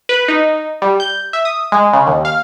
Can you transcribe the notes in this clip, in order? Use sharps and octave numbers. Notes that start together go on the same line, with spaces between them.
B4
D#4
G3
G6
E5
D#6
G#3
C#3
D#2
F5